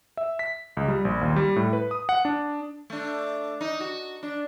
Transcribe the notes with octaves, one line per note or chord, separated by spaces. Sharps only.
E5
B6
C#2
G3
A#1
D#2
G3
A2
B4
D#6
F#5
D4
A3 D4
D#4
F#4
D4